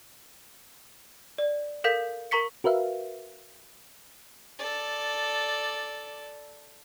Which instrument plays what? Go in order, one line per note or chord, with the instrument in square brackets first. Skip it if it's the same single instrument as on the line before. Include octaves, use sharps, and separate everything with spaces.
[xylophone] D5
A4 A#4 F5 G6 B6
A#4 A#5 C#6 B6 C#7
[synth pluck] F#4 A#4 B4 E5 F5
[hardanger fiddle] A4 D5